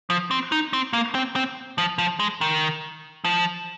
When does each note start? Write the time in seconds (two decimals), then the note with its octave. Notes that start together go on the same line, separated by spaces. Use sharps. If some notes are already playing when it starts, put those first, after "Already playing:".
0.10 F3
0.31 C4
0.52 D#4
0.73 C4
0.93 A#3
1.15 C4
1.36 C4
1.78 F3
1.98 F3
2.19 G#3
2.41 D#3
3.25 F3